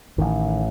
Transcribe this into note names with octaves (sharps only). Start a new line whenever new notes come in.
A1 A2 D#3